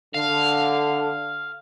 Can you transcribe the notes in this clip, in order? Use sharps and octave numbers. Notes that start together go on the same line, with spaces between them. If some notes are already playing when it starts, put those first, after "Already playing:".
D3 F5